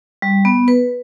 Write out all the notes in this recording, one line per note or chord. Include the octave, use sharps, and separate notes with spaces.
G3
B3
B4